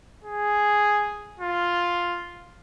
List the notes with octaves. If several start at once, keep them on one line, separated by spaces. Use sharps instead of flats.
G#4
F4